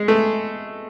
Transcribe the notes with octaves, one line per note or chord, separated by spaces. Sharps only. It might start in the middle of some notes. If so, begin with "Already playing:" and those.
Already playing: G#3
A3